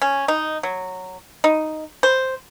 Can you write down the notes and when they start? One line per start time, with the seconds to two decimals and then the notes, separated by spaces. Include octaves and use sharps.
0.02 C#4
0.28 D#4
0.63 F#3
1.44 D#4
2.03 C5